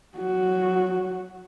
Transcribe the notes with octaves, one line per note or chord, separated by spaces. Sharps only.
F#3 F#4